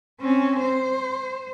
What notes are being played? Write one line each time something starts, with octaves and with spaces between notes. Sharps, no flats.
C4 C#4
C5